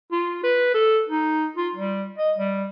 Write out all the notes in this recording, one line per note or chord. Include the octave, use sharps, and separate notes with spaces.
F4
B4
A4
D#4
F4
G3
D#5
G3